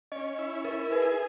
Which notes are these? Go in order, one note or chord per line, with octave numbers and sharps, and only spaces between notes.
C#4 D#5
E4
E4 A#4
G#4 B4